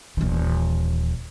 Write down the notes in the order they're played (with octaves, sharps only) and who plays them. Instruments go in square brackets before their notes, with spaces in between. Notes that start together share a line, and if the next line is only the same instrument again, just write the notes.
[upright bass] D#1 E3